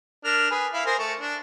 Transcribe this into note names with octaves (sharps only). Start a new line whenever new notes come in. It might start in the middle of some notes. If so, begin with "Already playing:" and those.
D4 A#4 F6
G#4 B4
E4 F5
G#4 A#4 C5
A3 A4 C#6
D4